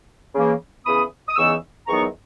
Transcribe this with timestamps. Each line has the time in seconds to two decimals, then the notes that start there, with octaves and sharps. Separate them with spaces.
0.34 C#3 E3 A#3 C#4
0.85 C#3 E3 B3 B5 D#6
1.29 D#6
1.36 E2 C#3 E3 B3 D#4 C#6 E6
1.87 E2 D#3 F#3 B3 D#4 A#5 C#6